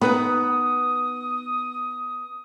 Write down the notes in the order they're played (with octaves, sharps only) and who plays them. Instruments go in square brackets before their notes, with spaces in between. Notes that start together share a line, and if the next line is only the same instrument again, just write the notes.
[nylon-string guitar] B3 [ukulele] D#4 B4 B5 [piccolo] D#6